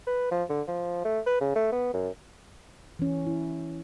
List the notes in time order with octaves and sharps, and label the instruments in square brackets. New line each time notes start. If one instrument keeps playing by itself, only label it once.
[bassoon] B4
F3
D3
F3
A3
B4
C#3
A3
B3
F#2
[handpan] E3 C#4
E4